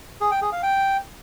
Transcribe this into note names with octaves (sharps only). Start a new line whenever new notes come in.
G#4
G5
G#4
F5
G5